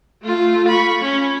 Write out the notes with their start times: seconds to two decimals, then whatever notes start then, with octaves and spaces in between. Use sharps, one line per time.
0.23 A3 F4
0.68 B5 C#6
1.02 C#4